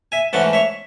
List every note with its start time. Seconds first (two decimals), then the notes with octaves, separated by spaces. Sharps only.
0.12 E5 G#5
0.33 G#2 E3 A3 C#4 F#5 A5
0.53 C#5 E5